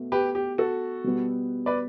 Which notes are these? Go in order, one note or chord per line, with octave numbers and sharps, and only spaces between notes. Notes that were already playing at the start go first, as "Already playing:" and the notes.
Already playing: B2 A3
G4 B4
G4
F#4 A4
B2 G3 B3
B4 D5